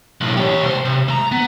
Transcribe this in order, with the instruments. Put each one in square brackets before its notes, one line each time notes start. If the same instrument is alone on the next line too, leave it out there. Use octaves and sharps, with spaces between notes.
[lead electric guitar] B1 A2
G4 C#5
C2 C5
C3
C#2 A#5
B3